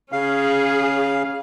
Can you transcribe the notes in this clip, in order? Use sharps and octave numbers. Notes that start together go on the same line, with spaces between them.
C#3 C#4 G#4 F5